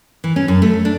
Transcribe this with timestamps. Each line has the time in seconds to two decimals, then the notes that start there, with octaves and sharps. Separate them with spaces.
0.24 E3
0.36 C#4
0.48 F#2
0.62 A3
0.85 D4